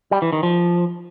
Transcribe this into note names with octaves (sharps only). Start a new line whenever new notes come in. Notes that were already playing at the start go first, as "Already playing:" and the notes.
G3
E3
D#3
F3